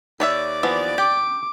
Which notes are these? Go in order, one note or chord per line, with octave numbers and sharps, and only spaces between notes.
D#2 B4 C#5 D5 E5
E3 F3 B3
G4 D6